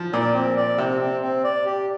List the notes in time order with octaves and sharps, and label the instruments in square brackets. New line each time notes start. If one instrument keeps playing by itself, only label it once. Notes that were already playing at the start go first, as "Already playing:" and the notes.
Already playing: [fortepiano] F3
[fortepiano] A#2 [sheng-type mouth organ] D5
[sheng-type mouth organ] C4
D5
[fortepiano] C3 [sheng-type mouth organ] C4
[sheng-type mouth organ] C4
C4
D5
G4